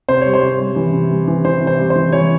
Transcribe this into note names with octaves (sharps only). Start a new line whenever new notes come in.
C3 C5
G3 C#5
C5
C3
G3
E3
C3
G3
E3
E3 C5
C3
C5
G3
C5
E3
E3 C#5